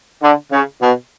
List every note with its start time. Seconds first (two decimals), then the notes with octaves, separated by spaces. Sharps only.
0.22 D3
0.52 C#3
0.82 B2